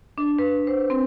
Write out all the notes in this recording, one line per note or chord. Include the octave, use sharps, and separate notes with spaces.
D4
B4
C5
C4